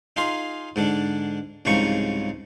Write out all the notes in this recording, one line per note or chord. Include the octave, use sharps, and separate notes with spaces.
D#4 F4 G#4 C6
G#2 D3 D4
C2 G#2 C#3 F3 D#4 C#6